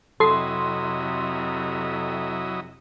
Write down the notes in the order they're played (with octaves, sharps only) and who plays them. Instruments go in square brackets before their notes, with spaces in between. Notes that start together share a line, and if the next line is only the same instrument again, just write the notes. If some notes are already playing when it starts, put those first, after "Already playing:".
[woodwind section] F2 C3 [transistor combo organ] F#3 E4 D#5 [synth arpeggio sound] A4 C7 [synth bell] C6